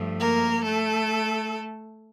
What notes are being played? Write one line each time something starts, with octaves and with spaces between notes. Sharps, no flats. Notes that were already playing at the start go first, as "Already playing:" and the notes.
Already playing: G2 F3 A3
A#3 A#4
A3 A4